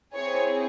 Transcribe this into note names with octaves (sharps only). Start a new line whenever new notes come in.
C4 E4 G#4 C#5